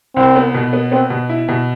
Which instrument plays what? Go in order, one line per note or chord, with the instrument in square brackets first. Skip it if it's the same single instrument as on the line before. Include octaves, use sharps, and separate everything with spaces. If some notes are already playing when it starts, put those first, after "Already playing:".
[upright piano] C2 [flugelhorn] C4
[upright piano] B3
B2
B3
[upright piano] B3 [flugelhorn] C4
[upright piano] B2
E4
B2